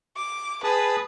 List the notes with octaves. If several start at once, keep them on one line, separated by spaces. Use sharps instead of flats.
D6
G#4 B4 A5 D#6